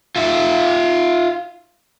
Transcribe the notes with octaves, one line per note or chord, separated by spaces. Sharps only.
F4 E5